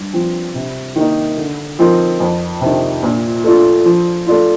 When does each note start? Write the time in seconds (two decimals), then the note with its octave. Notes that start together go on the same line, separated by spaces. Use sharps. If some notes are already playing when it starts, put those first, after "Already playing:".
Already playing: G2
0.13 F3 C4
0.55 C3
0.96 D#3 A#3 D#4
1.37 D3
1.79 F3 C4 D#4 A#4
2.20 F2
2.61 C3 D#3
3.03 A#2
3.44 A3 D4 F4
3.85 F3
4.27 A3 D4 F4